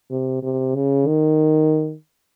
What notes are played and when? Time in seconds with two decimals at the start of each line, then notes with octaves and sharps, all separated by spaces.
0.11 C3
0.43 C3
0.75 C#3
1.07 D#3